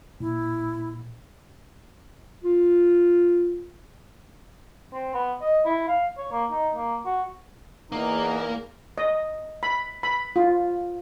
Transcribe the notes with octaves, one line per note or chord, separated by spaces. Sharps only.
A#2 E4
F4
C4
B3
D#5
E4
F5
C#5
A#3
D#4
A#3
F#4
E2 A#3 D#4 A#4
D#5
B5
B5
F4